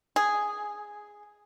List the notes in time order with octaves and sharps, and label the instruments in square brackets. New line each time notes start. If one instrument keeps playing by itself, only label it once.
[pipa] G#4